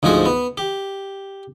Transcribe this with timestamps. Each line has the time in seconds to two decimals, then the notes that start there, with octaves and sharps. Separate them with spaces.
0.03 D2 G#2 F3 F#4 G#4
0.26 B3
0.58 G4